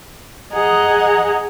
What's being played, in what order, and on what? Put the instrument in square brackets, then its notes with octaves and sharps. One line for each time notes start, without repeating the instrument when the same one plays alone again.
[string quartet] G#4 D#5 F#5 A#5